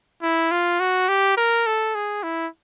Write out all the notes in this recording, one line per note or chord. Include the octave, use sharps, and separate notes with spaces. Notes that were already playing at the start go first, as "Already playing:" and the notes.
E4
F4
F#4
G4
A#4
A4
G#4
E4